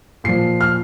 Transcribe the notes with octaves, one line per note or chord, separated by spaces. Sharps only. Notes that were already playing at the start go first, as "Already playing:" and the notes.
A#2 F3 C7
F6